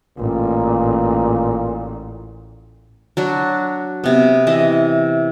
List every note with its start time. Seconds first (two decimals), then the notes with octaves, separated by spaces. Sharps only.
0.18 A1 A#2
3.17 F#3 D4 F#4
4.04 C3 B3
4.47 E3 D#5 E5